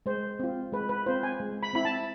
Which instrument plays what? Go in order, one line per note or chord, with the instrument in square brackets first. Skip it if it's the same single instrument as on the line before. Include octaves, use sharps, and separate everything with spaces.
[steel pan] G#3 C5
C4 F4
G#3 B4
B4
C4 F4 C5
G#5
G#3
B5
C4 E4 B5
A5